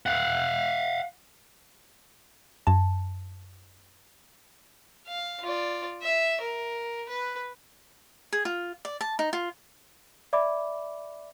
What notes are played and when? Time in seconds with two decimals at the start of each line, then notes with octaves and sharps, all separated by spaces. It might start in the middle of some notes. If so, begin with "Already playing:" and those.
0.06 F5 F#5
2.67 F#2 A5
5.07 F5
5.42 F4 D5
6.02 E5
6.41 A#4
7.08 B4
8.33 G#4
8.45 F4
8.85 D5
9.01 A5
9.19 D#4
9.33 F4
10.33 D5 E5 B5 D6